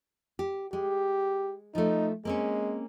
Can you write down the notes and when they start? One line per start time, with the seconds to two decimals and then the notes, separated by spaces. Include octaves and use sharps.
0.39 G4
0.73 G#3 G4
1.75 F3 A3 D#4
2.25 G#3 A#3 C4 C#4